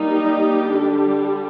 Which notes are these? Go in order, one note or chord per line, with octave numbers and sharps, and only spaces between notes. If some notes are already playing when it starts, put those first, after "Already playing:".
Already playing: G3 A#3 D#4
G4
D3 G3 D4